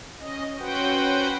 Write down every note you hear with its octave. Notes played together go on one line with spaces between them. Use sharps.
C#4 D#5
C#4 F#4 B4 C5 F#5 G5